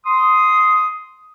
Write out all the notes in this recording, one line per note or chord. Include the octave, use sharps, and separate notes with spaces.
C6 D#6